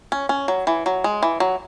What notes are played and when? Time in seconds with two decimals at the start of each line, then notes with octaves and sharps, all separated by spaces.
0.12 C#4
0.29 C#4
0.48 F#3
0.67 E3
0.86 F#3
1.04 G#3
1.23 E3
1.40 F#3